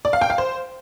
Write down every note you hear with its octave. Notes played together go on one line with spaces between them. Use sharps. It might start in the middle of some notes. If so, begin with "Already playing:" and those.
D5
F5
G5
F5
C5